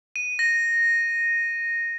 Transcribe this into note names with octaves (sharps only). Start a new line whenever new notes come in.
D#7
A#6